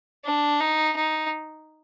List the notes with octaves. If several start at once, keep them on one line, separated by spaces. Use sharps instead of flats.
D4
D#4
D#4